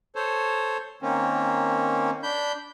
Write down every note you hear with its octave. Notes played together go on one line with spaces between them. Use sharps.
A4 C5 C#5
D#3 A#3 C4 C#4
D4 B5 G6